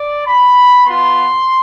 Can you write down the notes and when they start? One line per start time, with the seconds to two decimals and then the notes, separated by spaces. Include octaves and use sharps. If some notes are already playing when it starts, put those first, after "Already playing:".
Already playing: D5
0.27 B5
0.86 B3 F4 C6